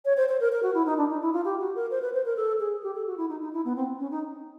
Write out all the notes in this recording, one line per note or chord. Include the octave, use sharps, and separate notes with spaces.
C#5
C5
C5
A#4
A#4
F#4
E4
D#4
D4
D#4
E4
F4
G4
F#4
A#4
C5
B4
C5
A#4
A4
G#4
G4
A4
F#4
E4
D#4
D#4
E4
B3
C4
C#4
D#4